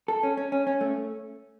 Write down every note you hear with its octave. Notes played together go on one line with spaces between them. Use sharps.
A4
C#4
C#4
C#4
C#4
A3